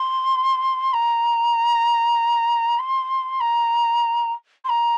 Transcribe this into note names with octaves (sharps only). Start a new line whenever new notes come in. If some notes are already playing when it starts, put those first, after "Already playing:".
Already playing: C6
A#5
C6
A#5
C6
A#5